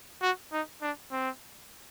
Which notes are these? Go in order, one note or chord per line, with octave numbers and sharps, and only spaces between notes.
F#4
D#4
D4
C4